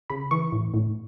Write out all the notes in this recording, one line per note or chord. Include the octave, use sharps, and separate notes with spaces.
C#3 B5
E3 C#6
A2
A2